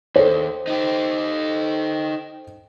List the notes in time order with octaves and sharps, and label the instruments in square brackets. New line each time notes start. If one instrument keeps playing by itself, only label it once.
[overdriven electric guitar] D#2 [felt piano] A4 C5
[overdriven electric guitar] D#4 G4